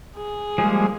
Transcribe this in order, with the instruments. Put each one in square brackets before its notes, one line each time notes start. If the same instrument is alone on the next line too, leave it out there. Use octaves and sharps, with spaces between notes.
[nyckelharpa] G#4
[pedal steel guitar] F3 G3 A#3 [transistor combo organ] G#3